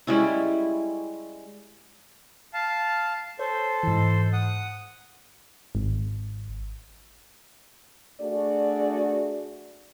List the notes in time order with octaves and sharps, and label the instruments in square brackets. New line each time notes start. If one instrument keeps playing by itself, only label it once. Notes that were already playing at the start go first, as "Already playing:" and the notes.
[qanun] G3 G#3 C#4 E4
[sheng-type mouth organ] F5 A5
[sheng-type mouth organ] A4 C5 [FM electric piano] C#5
[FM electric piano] G#2 E3
[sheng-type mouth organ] F#5 D#6
[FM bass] G#1
[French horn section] A3 D4 F#4 G#4 D5